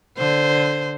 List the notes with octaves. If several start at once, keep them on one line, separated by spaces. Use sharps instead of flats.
D3 C5